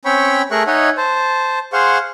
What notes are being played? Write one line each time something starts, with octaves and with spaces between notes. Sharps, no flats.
C4 C#4 C#5 G5 B5 C#6
A3 G#4 A#4 E5 C#6 F#6
D#4 C#5 D#5 E5 F#5 G#5
C5 A5
G#4 C5 F5 F#5 C6 C#6